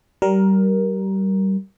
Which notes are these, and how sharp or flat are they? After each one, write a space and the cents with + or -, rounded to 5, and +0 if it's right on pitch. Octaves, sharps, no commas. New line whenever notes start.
G3 -25 A#4 +10